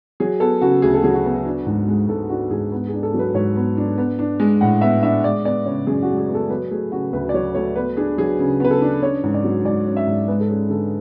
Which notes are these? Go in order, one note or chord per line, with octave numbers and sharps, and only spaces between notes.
F#3 G#4
B3 A4
C#3 F#4
D2 G#4
A4
F#3 G#4
F#4
B3
D4
G#2
G#3
G#2 A4
D4 F#4
G#2 G#4
B3
G#4
D4
A4
F#3
B4
G#2 C#5
B3
D4
B3
D4
G#3
A2 F#5
B3 E5
D4 E5
G#3 D5
B3 D5
C#3 C#5
F#2 G#4
F#4
G#3
G#4
B3
A4
F#3 B4
A3 G#4
C#3 F#4
D2 B4
D5
F#3 C#5
A3 C#5
B3 B4
D4 G#4
F#3 G#4
C#3
B3 B4
A4
D4
C#4 C#5
G#2
D5
F#3
G#2 D5
C#4
E5
G#2
G#3 B4
A4
C#4 G#4
D3 A4